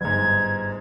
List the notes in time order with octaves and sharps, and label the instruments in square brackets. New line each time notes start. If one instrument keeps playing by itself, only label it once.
[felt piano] G1 G#2 [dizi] G#6